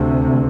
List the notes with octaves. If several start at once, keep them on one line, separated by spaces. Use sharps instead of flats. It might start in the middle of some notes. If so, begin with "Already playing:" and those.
Already playing: D2 C3